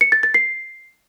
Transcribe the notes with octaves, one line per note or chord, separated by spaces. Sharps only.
C#7
A6
A6
C7